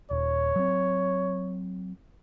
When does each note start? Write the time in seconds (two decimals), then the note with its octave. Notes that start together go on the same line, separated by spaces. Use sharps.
0.11 D#1 C#5
0.56 F#3 C4